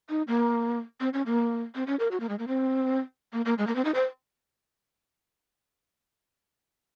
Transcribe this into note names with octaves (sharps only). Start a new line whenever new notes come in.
D#4
A#3
C4
C#4
A#3
C4
C#4
A#4
F#4
A#3
G#3
A#3
C4
A#3
A#3
G#3
A#3
C4
D#4
C5